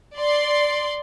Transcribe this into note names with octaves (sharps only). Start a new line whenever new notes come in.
D5 C6